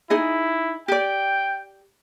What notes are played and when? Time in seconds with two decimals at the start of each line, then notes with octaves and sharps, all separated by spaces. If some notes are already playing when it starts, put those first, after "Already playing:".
0.10 D#4 E4 G#4 D#5
0.88 G4 D5 G5